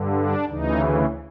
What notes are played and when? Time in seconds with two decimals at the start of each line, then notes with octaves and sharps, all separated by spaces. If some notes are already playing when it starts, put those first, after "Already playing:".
Already playing: G2 D3
0.13 D4
0.48 D2 C#3 E3 D#4